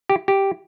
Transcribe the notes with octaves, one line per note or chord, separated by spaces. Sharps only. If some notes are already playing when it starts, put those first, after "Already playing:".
G4
G4